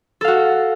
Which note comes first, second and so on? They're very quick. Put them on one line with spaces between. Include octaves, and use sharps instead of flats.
A4 F5 F#4